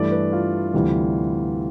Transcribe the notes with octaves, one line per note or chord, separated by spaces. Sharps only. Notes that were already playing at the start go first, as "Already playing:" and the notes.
Already playing: G2 E3 A3 D5
B4
F4
D2 C3 E3 G3